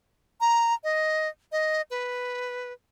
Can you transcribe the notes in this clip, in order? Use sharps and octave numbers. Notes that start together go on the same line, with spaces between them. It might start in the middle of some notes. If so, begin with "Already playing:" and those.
A#5
D#5
D#5
B4